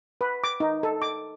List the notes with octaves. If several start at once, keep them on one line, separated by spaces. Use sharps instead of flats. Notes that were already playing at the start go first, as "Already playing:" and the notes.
B4
D6
D#4
A4
D6